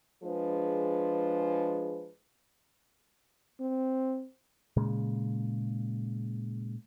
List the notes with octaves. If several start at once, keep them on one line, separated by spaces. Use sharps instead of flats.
F3 G#3 D4 G#4 B4
C4
A#2 C#3 G#3